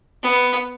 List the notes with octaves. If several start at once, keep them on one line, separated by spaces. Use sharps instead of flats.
B3